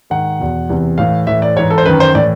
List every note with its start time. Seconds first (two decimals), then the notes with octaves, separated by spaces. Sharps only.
0.10 G#2 D#3 F#5
0.39 E2 B2
0.69 E2 C3 E3
0.98 A2 E3 F5
1.27 A2 E3 E5
1.42 D5
1.56 G#2 E3 C#5
1.70 A4
1.78 C5
1.85 F#2 D#3 B4
2.00 C5
2.14 A2 E3 D5